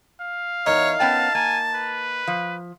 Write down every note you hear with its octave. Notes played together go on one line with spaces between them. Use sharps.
F5
E2 D#4 A#4 C#5
B3 C#4 G5 A5
A#3 G#5
B4
F3